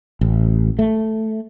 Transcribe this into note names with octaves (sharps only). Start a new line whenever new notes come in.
A1
A3